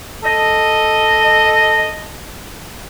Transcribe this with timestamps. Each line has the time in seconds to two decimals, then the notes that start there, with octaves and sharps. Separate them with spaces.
0.24 A4 D#5